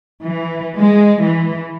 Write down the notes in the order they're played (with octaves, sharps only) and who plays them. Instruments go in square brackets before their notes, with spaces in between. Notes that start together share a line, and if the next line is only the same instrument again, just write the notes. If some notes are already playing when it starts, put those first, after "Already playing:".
[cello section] E3
G#3
E3